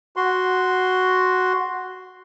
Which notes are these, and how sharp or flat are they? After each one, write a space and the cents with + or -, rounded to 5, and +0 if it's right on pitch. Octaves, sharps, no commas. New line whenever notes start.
F#4 +0 C6 +0